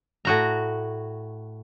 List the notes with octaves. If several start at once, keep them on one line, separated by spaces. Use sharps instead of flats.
A2 F#4 A#5